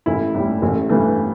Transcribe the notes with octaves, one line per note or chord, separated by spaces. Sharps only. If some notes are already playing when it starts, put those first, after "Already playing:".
A1 E4
A2 G3
A1
G2 E3 A3